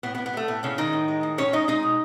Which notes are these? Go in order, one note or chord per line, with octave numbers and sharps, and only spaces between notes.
A2 B3
B3
A2
B3
G#3
A3
A2 B3
A2 C#3 C#4
D#3 G#3 D#4
A2
G#3
A2
A2 C#4 C#5
G#3 D#4 D#5
G#3 D#4 D#5
B2